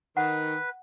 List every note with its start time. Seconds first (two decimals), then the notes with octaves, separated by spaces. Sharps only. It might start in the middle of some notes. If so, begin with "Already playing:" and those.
0.17 D#3 B4 F#5